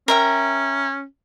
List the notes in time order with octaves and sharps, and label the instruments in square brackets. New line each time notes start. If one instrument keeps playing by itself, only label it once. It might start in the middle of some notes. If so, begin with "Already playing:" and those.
[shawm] C#4 [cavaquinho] A#4 E5 G5